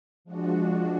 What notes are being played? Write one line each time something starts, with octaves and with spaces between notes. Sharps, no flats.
F3 G#3 D4 F#4